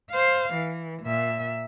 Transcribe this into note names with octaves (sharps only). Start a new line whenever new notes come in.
C5 F5
E3
A#2 E5